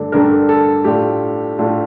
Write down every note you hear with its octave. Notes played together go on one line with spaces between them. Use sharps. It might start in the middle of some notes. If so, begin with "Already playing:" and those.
Already playing: G2 D3 A3 D4
G2 D3 A3 D4 A#4
A4
A2 A3 D4 F4 G4
A2 A3 D4 F4